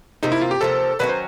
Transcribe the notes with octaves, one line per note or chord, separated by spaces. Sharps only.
C3 F3 A#3 D#4
E4
F4
G4
C3 F3 A#3 A4
D#3 F#3 A3 C#4 B4
C5